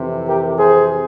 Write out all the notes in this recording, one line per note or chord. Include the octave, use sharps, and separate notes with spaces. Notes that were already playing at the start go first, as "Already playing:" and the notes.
Already playing: F2 C3 E3
G4 A#4
G#4 C5